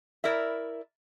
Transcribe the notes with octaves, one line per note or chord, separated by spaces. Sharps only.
E4 A#4 D5 E5